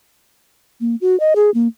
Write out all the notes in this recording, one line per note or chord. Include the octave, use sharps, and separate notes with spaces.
A#3
F#4
D#5
G#4
A#3